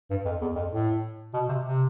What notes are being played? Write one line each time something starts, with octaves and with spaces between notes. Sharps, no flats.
G2
F2
E2
F2
A2
B2
C3
C3